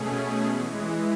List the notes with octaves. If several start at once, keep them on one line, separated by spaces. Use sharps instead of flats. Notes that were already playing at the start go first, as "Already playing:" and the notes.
Already playing: B2 A3 C#4 G#4
E3 G#3